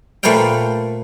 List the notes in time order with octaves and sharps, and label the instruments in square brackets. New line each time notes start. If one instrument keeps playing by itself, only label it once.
[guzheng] A#2 A3 B4 C5 F5 G5